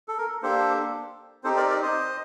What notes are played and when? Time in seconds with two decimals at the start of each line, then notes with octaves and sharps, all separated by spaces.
0.08 A4
0.18 A#4
0.43 A#3 D4 G4 A4 C5
1.44 C4 D#4 G4 A4 C5
1.57 A#4 D5
1.69 A#4 D5
1.82 C5 D#5